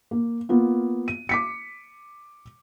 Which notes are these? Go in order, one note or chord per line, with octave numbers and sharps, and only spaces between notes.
A#3
A#3 B3 F4
D#7
D6 B6 C#7